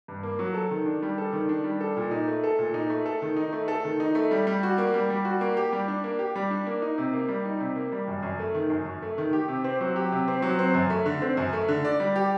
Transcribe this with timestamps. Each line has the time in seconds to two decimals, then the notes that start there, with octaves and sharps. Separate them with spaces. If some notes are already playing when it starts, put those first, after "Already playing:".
0.08 G2
0.23 A#3
0.39 F#3
0.54 A4
0.71 D#3
0.86 D4
1.02 G3
1.18 A4
1.33 D#3
1.49 D4
1.64 G3
1.81 A4
1.97 A#2
2.11 D#4
2.28 A3
2.44 A4
2.59 A#2
2.74 D#4
2.90 A3
3.06 A4
3.22 D#3
3.37 D#4
3.53 A3
3.68 A4
3.84 D#3
4.00 D#4
4.15 A3
4.31 G3
4.47 G3
4.63 F#4
4.78 A#3
4.94 G3
5.10 G3
5.25 F#4
5.41 A#3
5.57 G4
5.73 G3
5.88 D4
6.04 A#3
6.19 G4
6.36 G3
6.50 D4
6.66 A#3
6.82 D#4
6.98 C3
7.13 A#3
7.29 G3
7.45 D#4
7.60 C3
7.76 A#3
7.92 G3
8.08 F#2
8.23 F#2
8.39 A3
8.54 D#3
8.70 F#2
8.86 F#2
9.02 A3
9.18 D#3
9.33 G4
9.48 C3
9.64 C4
9.81 F#3
9.96 G4
10.12 C3
10.28 C4
10.42 F#3
10.59 C4
10.74 F#2
10.90 A3
11.06 D3
11.22 C4
11.37 F#2
11.53 A3
11.68 D3
11.85 D5
12.00 G3
12.16 G4